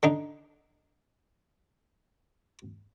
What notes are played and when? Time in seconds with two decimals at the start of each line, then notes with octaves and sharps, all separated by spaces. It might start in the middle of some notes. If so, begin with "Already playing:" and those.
0.03 D3 D4 D#4